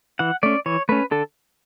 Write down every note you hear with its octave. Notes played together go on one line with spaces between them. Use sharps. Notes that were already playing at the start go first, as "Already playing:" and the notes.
E3 F#5
A3 C#4 D5
E3 C#5
A3 C#4 B4
D3 A4